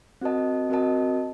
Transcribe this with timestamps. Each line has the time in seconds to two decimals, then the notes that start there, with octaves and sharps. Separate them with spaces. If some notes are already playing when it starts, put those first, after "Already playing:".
0.21 C4 F#4 A#4 D#5 A5
0.70 C4 F#4 A#4 D#5 A5